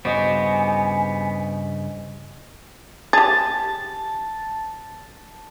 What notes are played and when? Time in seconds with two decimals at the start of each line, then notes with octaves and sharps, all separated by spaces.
0.05 G2 C#3 B3 F#4 G4 C5 D#5 G#5
3.13 G4 G#4 A5